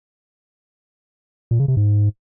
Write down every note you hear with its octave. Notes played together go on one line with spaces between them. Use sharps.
A#2
C#3
C3
G#2